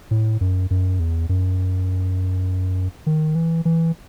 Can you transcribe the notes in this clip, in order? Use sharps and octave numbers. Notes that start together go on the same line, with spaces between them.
A2
F#2
F#2
E2
F#2
D#3
E3
E3